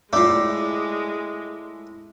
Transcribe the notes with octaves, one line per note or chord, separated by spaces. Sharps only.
A2 G#3 A3 F4 D5 D6